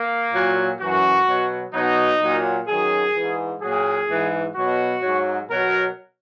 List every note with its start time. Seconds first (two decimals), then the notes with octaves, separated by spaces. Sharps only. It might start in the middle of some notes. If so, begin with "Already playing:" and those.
Already playing: A#3
0.32 A#2 F#3
0.79 F#2 E3 F#4
1.26 B2 F#3
1.73 B2 F#3 D#4
2.21 A#2 F#3
2.67 F#2 D#3 F#3 G#4
3.15 G#2 E3
3.62 A#2 F#3 G#4
4.08 G#2 E3
4.55 B2 F#3 F#4
5.02 G#2 F#3
5.49 B2 F#3 A#4